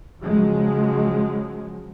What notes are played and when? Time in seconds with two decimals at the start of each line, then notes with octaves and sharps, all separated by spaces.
0.21 C#3 F3 F#3 G#3